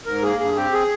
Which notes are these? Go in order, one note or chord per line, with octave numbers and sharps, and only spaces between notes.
G#2 A#4
A#3 G#4
G2 G#4
C4 G4
G#4